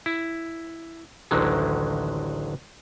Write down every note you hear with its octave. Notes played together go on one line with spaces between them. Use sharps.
E4
A1 D2 D3 D#3 F#3 G#3